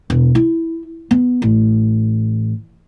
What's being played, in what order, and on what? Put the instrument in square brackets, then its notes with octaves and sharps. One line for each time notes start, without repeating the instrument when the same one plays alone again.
[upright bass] E1
E4
B3
A1